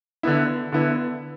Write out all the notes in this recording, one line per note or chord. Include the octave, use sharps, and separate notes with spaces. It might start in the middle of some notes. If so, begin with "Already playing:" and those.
D3 B3 E4
D3 B3 E4